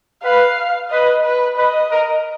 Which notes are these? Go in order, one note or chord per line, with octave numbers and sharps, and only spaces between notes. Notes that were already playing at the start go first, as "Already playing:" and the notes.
B4 F5
B4 D#5
B4
B4 D#5
A#4